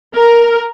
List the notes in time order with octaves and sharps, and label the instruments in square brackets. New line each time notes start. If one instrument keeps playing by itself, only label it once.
[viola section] A#4